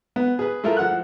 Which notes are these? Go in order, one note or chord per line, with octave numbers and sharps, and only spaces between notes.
B3
G#4 B4
A3 E4 F4 A4 A#4
F3 F#5 F#6